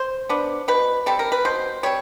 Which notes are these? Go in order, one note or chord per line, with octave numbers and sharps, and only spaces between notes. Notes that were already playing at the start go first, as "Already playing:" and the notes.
Already playing: C5
B3 D4
B2 B4
G3 C4 A4
A#4
B4
B2 C5
G3 C4 C#5